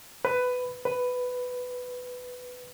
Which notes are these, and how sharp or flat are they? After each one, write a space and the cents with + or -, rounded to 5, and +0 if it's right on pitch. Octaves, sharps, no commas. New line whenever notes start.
B4 +15
B4 +10